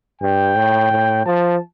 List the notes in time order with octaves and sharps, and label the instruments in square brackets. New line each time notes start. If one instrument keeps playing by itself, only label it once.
[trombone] G2 [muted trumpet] G5
[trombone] A2
A2
[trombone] F3 [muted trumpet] A5